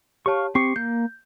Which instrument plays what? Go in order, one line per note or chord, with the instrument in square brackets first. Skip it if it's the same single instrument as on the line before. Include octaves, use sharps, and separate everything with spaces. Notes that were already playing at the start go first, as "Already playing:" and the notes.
[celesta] G4 C#5 A5 [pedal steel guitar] F5 C#6
[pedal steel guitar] C4 G4 C#6 [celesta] C7 C#7
[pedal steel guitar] A#3 [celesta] G6